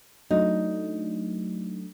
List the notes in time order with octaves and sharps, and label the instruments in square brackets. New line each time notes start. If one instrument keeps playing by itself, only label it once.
[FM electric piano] F#3 A3 D4 [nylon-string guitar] D#4